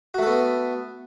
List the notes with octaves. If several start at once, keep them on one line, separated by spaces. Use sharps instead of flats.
A3 B3 F#4 A4